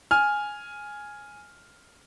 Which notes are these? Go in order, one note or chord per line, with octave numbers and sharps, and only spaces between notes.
G#5 F6